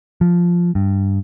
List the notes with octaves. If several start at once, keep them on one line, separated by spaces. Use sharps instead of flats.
F3
G2